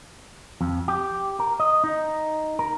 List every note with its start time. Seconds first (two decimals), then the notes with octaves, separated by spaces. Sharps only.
0.61 F2
0.88 G4
1.40 A#4
1.60 D#5
1.84 D#4
2.59 A#4